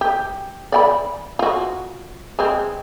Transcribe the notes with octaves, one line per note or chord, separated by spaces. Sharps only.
G4
D5 G5 B5
F4 F#4
G#3 C4